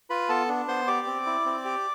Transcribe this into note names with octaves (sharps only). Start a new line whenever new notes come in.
F4 B4 B5
B3 A4 A5
D4
B3 C5 C6
G4 D5 D6
C4
E4
C4
G4